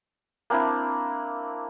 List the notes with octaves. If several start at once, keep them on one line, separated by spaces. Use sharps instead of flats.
A#3 C4 D4 E4